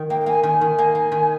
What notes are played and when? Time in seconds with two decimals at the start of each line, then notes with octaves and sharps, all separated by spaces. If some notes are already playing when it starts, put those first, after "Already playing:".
Already playing: D#3
0.09 A#3 G5
0.20 G5
0.26 A#3 G#5
0.43 D#3 G#5
0.61 D#3
0.78 A#3
0.95 A#3
1.12 D#3